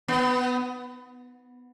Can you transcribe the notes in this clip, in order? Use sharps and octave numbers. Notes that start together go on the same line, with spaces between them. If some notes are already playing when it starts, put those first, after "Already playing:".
B3